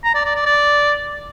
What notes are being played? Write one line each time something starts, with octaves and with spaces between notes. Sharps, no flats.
A#5
D5
D5
D5
D5